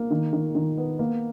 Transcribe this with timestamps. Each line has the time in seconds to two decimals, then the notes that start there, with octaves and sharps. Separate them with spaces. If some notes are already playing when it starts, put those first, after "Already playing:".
Already playing: A#3
0.11 D#3
0.33 D#3
0.55 D#3
0.77 B3
0.99 A#3